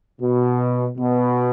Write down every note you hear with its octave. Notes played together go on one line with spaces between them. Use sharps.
B2
B2